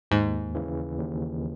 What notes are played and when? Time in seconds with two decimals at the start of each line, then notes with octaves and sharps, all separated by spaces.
0.11 D#2 G#2
0.55 C#3 E3
0.99 D#2